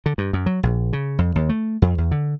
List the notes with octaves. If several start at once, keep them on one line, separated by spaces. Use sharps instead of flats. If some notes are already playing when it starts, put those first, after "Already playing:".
D3
G2
F#2
F#3
A#1
C#3
F2
D#2
A3
F2
E2
D3